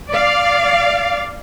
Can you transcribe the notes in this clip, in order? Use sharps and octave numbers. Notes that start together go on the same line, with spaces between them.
D5 F5